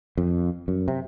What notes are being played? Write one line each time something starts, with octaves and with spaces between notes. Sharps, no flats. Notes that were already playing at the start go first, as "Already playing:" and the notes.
F2
F#2
C3